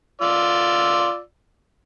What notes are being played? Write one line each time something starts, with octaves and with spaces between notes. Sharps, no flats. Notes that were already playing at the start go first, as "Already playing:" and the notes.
F4 D5 E6